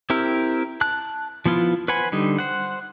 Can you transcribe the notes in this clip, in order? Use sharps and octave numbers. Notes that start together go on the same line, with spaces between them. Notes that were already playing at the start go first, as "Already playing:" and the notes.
C4 E4 G4 A#4
A5 F#6
F3 B3 E4 F4
B4 C5 F#5 G#5 B5
D3 G3 D#4
C5 F#5